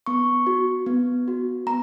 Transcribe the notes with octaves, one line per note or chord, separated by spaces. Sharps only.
B3 C#6
F#4
B3
F#4
B3 A#5